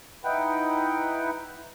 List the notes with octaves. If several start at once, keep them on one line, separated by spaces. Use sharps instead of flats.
D#4 E4 B4 F#5 G5